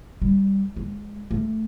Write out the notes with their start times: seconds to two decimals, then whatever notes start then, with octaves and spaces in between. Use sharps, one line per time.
0.22 G3
0.77 G#3
1.31 A3